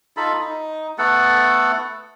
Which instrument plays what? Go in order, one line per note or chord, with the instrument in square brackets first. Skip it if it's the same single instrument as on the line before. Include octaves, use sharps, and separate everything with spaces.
[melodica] D#4 F4 A4 B5
D#4
A3 B3 A4 F#5